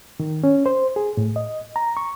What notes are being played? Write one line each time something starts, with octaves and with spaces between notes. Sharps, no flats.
D#3
C#4
C5
G#4
A2
D#5
A#5
C#6